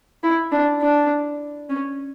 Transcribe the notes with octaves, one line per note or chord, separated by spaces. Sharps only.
E4
D4
D4
C#4